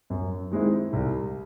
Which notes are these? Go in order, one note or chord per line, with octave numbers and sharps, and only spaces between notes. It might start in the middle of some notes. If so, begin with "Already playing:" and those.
F#2
D#3 G#3 C4 E4
C2